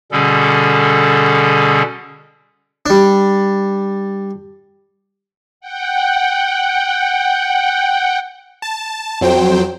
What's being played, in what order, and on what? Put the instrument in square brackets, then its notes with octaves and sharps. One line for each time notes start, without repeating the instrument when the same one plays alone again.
[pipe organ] B2 D3 G3 C#4 G#4 A4
[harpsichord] G3 D4
[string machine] F#5 G5
[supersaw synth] A5
F2 F#3 C5 G5